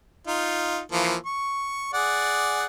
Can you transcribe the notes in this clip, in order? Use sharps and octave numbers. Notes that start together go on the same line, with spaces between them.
D#4 F4
E3 F3 A#3
C#6
G#4 D5 F#5